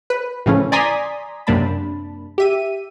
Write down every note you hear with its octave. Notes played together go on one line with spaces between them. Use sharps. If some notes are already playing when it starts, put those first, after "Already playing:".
B4
A2 C#3 E3 F3 A3 C#4
D5 G#5 A#5 C6 D#6 B6
F#2 C3 A#3 D4 A5 B5
G4 E5 D#7